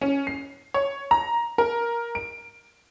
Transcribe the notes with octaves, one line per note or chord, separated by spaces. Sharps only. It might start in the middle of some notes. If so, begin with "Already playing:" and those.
C#4
C7
C#5
A#5
A#4
D7